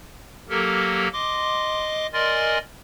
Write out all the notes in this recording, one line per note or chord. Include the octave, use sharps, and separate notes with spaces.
F#3 A#3 G4 A4 A#4
D#5 C6 D6
A#4 D5 D#5 G#5 C6 A6